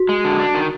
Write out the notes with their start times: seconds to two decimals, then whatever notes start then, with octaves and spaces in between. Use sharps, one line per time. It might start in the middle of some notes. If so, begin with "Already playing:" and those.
Already playing: F#4
0.09 G#3
0.24 D3
0.40 D4
0.54 D#3